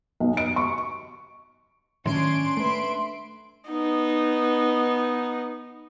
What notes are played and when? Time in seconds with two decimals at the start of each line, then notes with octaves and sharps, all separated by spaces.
0.20 B1
0.37 D7
0.56 C#6
2.05 A2 D#3 F#3 C#4 D4 C6 D7
2.57 A3 B4 E5
3.69 B3 D#4